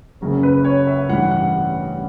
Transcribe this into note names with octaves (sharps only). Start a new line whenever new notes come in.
F#1 F#2 C#3 F#3 C#4
B4
C#5
E5
A1 G2 E3 F#5
F#5